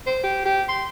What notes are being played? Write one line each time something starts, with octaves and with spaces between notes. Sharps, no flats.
C5
G4
G4
C6